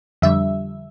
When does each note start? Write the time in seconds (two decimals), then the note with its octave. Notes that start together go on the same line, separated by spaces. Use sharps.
0.22 F2 D3 G3 E5